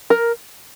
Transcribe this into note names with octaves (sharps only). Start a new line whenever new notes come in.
A#4